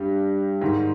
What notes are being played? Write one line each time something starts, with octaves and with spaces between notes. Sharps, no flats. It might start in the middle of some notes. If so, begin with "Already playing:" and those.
Already playing: G2 G4
G#2 D#3